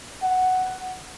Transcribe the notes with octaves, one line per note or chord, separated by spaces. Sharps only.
F#5